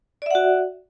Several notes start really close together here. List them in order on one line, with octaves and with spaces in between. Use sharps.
D5 E5 F#5 F#4